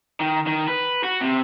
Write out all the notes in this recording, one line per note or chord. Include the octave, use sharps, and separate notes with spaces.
D#3
D#3
B4
F#4
C3